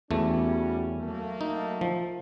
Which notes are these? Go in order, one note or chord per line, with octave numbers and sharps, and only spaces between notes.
E2 G3 A3 C#4 F#4
F#3 A3 A#3
D#4
F3